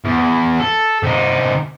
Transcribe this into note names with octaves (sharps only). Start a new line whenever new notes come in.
E2
A4
C3 D#4